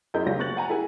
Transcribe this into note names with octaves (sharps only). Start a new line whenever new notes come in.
F#2 E4 G#4 A#4 D#5 G6
C#2 G3 C#4 F4 A#6
F#1 C#6 F#6 A6 F#7
F#5 G#5 A#5
E4 G4 G#4 A#4 G#5